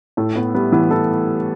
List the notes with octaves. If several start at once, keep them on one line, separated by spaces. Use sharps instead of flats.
A2 A3
A2 B3
G3 B3
E3 B3
E3 A4